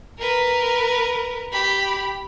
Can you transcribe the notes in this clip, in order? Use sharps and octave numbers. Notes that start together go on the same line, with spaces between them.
A#4 B4
G4 B5